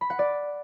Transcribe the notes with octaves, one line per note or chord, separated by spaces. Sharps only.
B5
F#5
D5